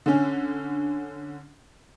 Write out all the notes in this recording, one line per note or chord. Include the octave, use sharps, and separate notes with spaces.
D3 C#4